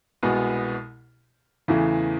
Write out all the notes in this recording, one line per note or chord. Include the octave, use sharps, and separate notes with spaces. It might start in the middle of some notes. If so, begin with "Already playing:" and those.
C2 B2 G#3 B3
E2 C#3 E3 A3